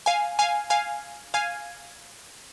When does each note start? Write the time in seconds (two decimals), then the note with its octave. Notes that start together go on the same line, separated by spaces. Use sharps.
0.06 F5 G#5
0.39 F5 G#5
0.70 F5 G#5
1.34 F5 G#5